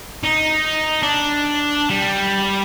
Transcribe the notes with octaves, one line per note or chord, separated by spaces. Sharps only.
D#4
D4
G3